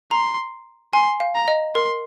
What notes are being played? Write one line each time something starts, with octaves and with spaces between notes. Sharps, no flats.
A#5 C6
G#5 C6
F5
A#5
D#5
A#4 C6